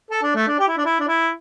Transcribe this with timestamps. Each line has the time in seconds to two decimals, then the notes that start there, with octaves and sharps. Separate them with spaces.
0.11 A4
0.23 D4
0.35 A3
0.47 D4
0.59 G4
0.68 E4
0.77 D4
0.85 E4
1.00 D4
1.08 E4